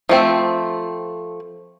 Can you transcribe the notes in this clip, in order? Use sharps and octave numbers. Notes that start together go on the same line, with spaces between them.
F3 A3 C4